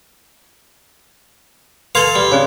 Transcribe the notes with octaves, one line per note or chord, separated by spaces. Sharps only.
A4 B4 F5 C6 G#6
G3
C#3 C4 C6